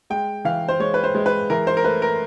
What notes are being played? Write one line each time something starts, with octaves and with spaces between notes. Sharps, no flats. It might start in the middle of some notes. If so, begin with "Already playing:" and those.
G#3 G5
E3 F5
C5
G#3 C#5
B4
C5
G#3
B4
E3 A#4
C5
A#4
A3 B4
A#4